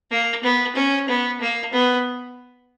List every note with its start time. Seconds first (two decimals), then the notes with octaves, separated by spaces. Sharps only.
0.11 A#3
0.43 B3
0.76 C#4
1.08 B3
1.41 A#3
1.73 B3